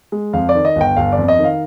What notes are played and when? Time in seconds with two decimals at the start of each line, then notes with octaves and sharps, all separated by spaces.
0.12 G#3
0.33 F2 F5
0.49 D5
0.55 D#3
0.65 D#5
0.76 G1 G5
0.97 G1 F5
1.12 D5
1.18 F2
1.28 D#5
1.39 D#3
1.44 F5